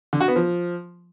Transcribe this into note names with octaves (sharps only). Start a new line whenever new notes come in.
D3
F#4
B3
F3